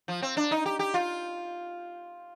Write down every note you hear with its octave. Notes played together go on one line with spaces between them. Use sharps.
F3
C4
D4
D#4
G4
G4
F4